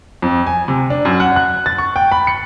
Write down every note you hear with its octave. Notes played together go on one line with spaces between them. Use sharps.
F2
G#5
C3
D4
F#2
F#5
F#6
A6
C#6
G5
B5
C#7